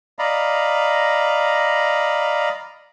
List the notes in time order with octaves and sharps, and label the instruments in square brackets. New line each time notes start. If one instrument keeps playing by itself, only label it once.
[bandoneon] D5 D#5 F5 A#5 B5